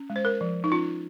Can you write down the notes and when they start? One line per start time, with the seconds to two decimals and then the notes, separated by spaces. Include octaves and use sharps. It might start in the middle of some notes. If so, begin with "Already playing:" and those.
Already playing: C#4
0.10 G#3
0.16 C5
0.25 A#4
0.41 F3
0.64 D#4
0.72 C#4 F4